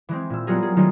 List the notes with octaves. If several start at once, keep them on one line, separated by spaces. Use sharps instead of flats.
E3 G#3 C4
A#2 E6
F#3 G3 B3 F4 G#4 A#4
G#4
D#3 F#3 G3 A3 D#4 F4